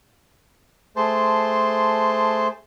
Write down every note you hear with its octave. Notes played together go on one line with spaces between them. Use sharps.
A3 G#4 C5 A5 C6